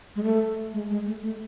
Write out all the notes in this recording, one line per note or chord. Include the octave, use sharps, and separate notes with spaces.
G#3
A3
G#3
G#3
A3
A3